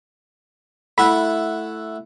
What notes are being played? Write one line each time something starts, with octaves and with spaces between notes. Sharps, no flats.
A3 E4 F#5 B5